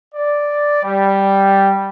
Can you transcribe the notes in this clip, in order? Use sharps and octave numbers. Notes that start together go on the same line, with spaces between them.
D5
G3